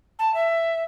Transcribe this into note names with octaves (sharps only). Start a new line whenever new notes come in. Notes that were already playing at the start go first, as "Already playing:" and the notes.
A5
E5